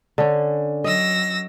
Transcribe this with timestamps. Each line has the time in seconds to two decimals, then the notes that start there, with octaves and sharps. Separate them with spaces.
0.18 D3 C#4
0.84 F#3 D#5 E6 A#6